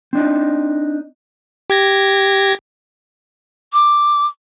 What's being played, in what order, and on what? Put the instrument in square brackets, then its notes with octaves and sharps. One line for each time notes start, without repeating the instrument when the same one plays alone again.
[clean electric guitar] C4 D4 D#4
[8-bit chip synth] G4 G#6 A#6
[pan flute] D6